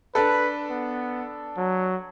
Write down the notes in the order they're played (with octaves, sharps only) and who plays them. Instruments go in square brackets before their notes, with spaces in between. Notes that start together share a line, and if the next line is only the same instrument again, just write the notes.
[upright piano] D4 A4 [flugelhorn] B4
[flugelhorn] B3
F#3